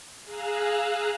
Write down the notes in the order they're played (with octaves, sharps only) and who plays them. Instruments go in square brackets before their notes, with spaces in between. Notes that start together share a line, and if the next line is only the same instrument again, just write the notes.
[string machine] G#4 F5 A#5 E6 F#6